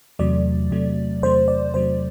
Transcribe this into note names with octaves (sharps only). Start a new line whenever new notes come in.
E2 C3 F#3 A3 D5
E2 C3 F#3 A3
E2 C3 F#3 A3 C5
D5
E2 C3 F#3 A3 C5